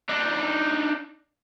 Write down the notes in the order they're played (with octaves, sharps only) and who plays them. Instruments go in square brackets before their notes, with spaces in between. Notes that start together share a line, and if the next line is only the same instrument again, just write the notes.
[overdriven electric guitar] D4 D#4